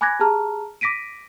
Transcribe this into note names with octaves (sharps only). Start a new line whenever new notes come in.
G#5 B5 D6 F#6 G#6 A#6
G4 G#4 A5 A#5 F6
D6 A#6 B6 D7 D#7